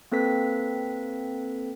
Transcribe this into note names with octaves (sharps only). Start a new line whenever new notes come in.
A#3 C4 A4 B4 B6